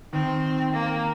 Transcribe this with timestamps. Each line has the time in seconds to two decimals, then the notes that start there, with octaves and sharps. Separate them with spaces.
0.13 D#3 C4
0.73 A#3